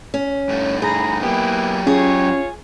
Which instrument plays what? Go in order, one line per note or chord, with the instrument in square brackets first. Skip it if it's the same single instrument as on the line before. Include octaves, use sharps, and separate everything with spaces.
[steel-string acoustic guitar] C#4
[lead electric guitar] G2 A3
[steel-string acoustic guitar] G#4 [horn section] A#5 B5
[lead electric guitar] F#3 G4 [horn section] A#3 B3 E4
[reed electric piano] C#4 [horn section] F4 C#5 [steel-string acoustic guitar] G#4